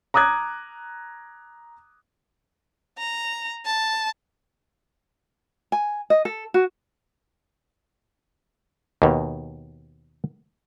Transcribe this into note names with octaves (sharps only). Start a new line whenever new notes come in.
A#5 D6 D#6 F#6 G#6
A#5
A5
G#5
D#5
A4
F#4
D#2 B2